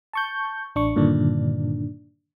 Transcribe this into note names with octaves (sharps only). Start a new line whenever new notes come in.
A5 C#6 G6
A1 D4 C#6
G2 A#2 D3 D#3 D4